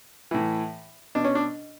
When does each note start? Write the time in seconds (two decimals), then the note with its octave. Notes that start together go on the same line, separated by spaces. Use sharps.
0.31 A2 E3
1.15 B2 D4
1.24 C#4
1.35 D4